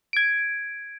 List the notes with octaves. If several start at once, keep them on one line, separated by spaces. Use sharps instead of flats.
G#6 D7